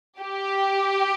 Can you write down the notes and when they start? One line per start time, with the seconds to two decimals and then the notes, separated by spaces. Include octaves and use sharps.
0.20 G4